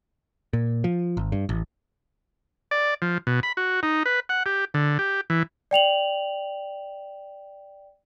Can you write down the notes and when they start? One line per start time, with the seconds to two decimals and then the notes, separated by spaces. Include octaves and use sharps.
0.53 A#2
0.84 F3
1.17 G#1
1.32 G2
1.49 A1
2.71 D5
3.02 F3
3.27 B2
3.43 B5
3.57 F#4
3.83 D#4
4.06 B4
4.29 F#5
4.46 G4
4.74 D3
4.99 G4
5.30 E3
5.71 D5 G5 F7 F#7